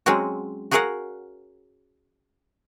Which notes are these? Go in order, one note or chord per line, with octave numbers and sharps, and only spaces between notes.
F#3 G#3 C4 C#4 F#4
F#4 G#4 A#4 C#5 F5 F#5